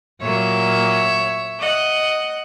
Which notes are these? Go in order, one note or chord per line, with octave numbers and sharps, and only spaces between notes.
A#2 F#3 A#3 C#5 E5
D#5 F#5